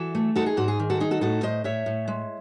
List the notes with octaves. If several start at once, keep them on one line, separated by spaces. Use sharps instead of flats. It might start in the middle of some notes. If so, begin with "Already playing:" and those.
Already playing: E3 F#4 A4
A3
D#4 F#4 A4
G#4
G#2 F#4
G#4
D#3
F#4 A4
D#4 G#4
F#4 A4
A2 F#4 A4
A2 C5 D#5
A2 C#5 E5
A2
G#3